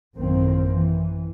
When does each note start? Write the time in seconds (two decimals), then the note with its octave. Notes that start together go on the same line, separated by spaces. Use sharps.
0.15 A1 F#2 D#3 A#3 C4
0.71 E3